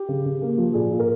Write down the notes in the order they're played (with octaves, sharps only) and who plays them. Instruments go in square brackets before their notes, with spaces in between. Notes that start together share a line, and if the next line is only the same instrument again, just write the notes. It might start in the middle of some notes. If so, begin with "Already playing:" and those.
Already playing: [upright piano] G4
C#3
C#3
A#3
F3
A#2 G#4
A#2
A#4